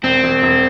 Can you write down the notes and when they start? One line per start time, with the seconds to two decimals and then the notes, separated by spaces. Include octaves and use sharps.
0.03 E1 C4
0.23 E1
0.42 E1